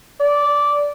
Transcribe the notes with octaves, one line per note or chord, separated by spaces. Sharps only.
D5